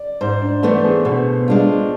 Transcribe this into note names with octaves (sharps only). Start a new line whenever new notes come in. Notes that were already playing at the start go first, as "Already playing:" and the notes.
Already playing: D5
G#2 C5
D4
E3 A3 B3 D4
G#4
B2
G#3 D4 F4